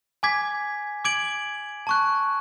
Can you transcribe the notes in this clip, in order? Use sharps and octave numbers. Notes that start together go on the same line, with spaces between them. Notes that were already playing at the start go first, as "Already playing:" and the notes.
G#5 D6 G#6 B6
D6 G#6 D7 F#7
A5 C#6 F#6